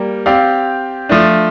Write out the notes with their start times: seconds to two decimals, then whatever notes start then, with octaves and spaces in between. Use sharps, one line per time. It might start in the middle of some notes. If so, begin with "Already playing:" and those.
Already playing: G3 A#3
0.26 C4 G4 D5 F5
1.09 F3 A3 D4